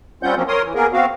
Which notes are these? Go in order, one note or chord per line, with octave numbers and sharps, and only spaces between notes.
G3 C4 C#4 F4 F#5 G6
F3 F#3 A#3 C4 C#4
A#4 C#5 C6 D#6
E3
A#3 B3 G#4 A#4
B3 C4 F#4 F5